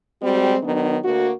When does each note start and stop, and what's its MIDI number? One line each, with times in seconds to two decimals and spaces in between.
0.22 0.58 55
0.22 0.58 56
0.22 0.58 60
0.22 0.58 66
0.64 0.97 51
0.64 0.97 54
0.64 0.97 59
0.64 0.97 62
1.04 1.32 38
1.04 1.32 58
1.04 1.32 66